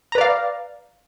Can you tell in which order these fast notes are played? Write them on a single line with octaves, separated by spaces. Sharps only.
A#5 B4 D5 F5